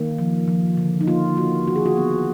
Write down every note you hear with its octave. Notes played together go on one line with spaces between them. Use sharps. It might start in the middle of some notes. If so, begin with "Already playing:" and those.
Already playing: D#3 A#3
F3
F3
D3
D#4
A#3 F4
A#3 F#4
D#3 F#4
G#4
F#4
F#3 B3